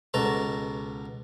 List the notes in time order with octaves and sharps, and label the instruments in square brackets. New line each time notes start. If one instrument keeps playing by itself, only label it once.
[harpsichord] C#2 B2 A4 A#5